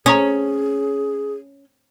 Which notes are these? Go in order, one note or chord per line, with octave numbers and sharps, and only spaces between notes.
C#4 G#4 A#5 C#6 D#6